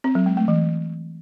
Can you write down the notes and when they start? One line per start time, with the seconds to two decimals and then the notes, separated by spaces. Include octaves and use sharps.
0.04 C4
0.15 F#3
0.26 G#3
0.37 A3
0.48 E3